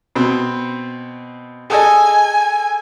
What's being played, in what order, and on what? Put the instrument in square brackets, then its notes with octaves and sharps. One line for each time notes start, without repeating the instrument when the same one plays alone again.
[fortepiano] B2 C4
[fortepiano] G#4 A4 D#5 [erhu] G#5